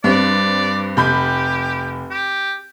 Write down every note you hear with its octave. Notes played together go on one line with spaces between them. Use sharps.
G2 C4 D5
F1 G4 B5 G6
G4